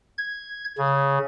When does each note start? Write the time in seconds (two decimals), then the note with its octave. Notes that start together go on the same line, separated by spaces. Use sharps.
0.18 G#6
0.78 C#3